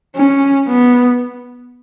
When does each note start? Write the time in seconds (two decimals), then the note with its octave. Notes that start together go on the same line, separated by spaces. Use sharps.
0.16 C#4
0.68 B3